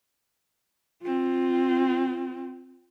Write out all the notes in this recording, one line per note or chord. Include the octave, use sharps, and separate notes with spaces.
C4 F4